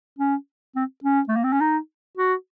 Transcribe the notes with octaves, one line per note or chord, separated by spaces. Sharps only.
C#4
C4
C#4
A3
A#3
C4
C#4
D#4
F#4